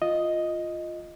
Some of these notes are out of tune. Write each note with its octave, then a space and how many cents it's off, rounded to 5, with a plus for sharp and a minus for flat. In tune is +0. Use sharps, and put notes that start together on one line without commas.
F4 +0 D#5 +0